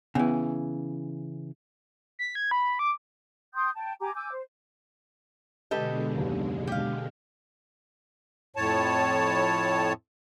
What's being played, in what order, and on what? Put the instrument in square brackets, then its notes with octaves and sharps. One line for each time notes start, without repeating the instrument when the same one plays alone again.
[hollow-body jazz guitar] C#3 E3 [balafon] B3
[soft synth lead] B6
G#6
B5
D6
[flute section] G5 C6 D#6 G6
G5 A5
G4 G#5 A#5 D6
G#5 D6 E6 G6
C5
[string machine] B2 D3 G#3 [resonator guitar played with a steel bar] G4 A4 B4 [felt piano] D#5
[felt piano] F#1 D#2
[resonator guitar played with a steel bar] G4 F5
[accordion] F2 A2 C#5 A5